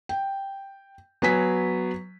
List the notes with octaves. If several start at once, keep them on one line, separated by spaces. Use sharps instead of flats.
G5
F#3 B3 G#5 B6